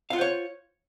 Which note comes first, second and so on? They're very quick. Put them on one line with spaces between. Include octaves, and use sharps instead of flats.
F5 F4 F#5 C5 C#5